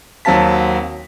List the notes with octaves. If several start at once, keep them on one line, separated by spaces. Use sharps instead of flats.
D#2 F#3 C4 F5 A5 B6